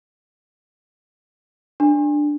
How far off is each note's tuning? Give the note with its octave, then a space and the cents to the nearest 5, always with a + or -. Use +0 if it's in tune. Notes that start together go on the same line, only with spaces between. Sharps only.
D4 +10